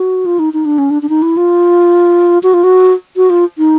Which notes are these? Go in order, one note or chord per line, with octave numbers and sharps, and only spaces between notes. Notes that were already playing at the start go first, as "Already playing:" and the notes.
Already playing: F#4
F4
D#4
D#4
D4
C#4
D4
D4
D#4
E4
F4
F#4
F4
F#4
F#4
F4
D#4